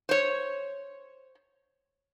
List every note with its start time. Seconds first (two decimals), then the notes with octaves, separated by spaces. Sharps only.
0.09 C5 C#5